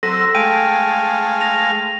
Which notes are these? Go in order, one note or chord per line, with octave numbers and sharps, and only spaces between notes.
F#3 C4 A4 E6 A#6
G#3 A3 F5 G5 D#7
A#6 F7